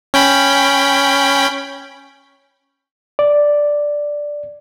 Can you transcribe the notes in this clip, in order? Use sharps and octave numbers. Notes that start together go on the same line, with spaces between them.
C#4 G5 B5
D5